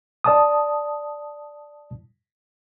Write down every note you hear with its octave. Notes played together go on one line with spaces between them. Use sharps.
D5 A5 D#6